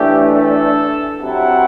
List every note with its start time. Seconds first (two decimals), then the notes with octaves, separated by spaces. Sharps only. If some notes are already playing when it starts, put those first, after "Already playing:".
Already playing: A2 E3 A3 D4 G4
0.35 A4
1.22 C3 F#3 C4 E4 F#5